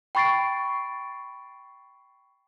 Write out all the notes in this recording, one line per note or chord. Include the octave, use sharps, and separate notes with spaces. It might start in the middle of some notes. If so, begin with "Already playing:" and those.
G5 B5 C#6 A6 C7 D7